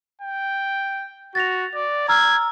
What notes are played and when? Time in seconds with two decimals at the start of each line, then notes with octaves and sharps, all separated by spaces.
0.21 G5
1.35 F#4 A6 A#6 F7
1.75 D5
2.08 A#5 E6 F6 G#6